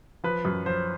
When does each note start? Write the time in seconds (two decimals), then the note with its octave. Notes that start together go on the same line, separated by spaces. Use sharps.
0.24 F3 B4
0.45 F#2
0.66 F3 C5